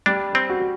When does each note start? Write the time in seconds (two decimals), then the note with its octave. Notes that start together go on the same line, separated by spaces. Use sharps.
0.06 G3 D4
0.35 C4
0.50 F#4